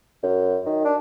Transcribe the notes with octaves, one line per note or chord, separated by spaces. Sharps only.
F#2
D#3
D4